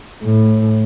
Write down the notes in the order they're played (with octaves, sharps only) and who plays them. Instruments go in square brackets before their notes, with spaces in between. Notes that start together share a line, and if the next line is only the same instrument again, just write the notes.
[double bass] A2